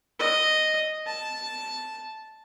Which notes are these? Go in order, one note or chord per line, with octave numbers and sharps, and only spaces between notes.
D#5
A5